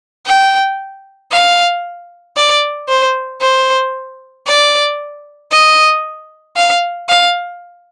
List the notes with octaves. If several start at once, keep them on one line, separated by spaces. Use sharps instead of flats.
G5
F5
D5
C5
C5
D5
D#5
F5
F5